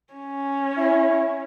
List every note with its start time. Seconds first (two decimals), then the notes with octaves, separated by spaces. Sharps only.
0.13 C#4
0.77 E4